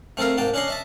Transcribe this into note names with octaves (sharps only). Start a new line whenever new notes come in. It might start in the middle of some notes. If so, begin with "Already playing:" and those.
A3 C4 A4 A#4 F5
G#2 A#3 G5 A5
C#4 D4 C#5 D#5 C6
D#5 E5 A5